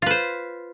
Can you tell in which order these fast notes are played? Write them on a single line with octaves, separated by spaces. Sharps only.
F4 B4 C5